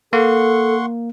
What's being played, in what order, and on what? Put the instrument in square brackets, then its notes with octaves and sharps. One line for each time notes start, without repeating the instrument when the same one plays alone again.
[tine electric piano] A#3 [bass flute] A4 [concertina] F#5 C6 C#6